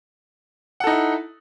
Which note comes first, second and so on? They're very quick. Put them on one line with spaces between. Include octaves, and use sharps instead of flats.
F#5 A4 D#4 E4